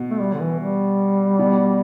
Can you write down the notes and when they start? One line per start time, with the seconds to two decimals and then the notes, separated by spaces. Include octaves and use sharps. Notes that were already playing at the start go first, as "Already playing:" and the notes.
Already playing: B2
0.11 A3
0.20 G3
0.34 D3
0.40 E3
0.60 G3
1.39 B2